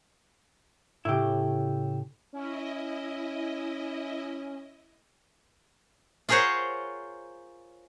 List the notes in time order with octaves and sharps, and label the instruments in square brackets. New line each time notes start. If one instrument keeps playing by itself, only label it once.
[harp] A2 C#3 [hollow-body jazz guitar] E4 G4
[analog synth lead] C#4 [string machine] E4 D#5
[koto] F4 G#4 A#4 C5 C#5 F#5